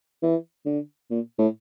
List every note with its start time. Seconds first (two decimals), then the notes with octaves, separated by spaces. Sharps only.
0.23 E3
0.66 D3
1.10 A#2
1.39 A2